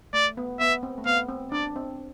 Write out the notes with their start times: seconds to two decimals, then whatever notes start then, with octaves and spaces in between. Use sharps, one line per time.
0.13 A3 D5
0.37 B3
0.60 B3 E5
0.83 C4
0.98 A3
1.06 B3 F5
1.29 C4
1.52 D4 D5
1.76 C4